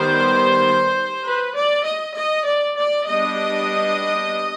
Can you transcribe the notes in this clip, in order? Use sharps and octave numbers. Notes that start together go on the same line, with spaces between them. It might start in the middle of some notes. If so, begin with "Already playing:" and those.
Already playing: D#3 G3 B3 C5
B4
D5
D#5
D#5
D5
D5
G3 B3 D4 D#5